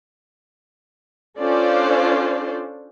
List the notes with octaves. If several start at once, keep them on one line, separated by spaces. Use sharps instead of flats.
C#4 D4 F4 A4 C5 D5